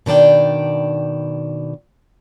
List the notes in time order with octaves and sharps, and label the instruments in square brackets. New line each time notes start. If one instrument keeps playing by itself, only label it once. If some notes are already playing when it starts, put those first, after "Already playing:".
[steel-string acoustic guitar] B2 D#3 D4 D5 G5